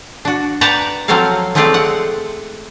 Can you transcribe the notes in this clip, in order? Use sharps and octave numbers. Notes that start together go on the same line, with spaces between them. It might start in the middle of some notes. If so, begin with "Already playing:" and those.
D4 F#4
B4 D5 F#5 G5 A5 A#5
F3 F#3 C4 C#4 A4 F5
F3 G#3 A3 C4 F4 D5
F#5